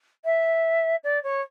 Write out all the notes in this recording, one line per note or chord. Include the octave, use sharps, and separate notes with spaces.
E5
D5
C#5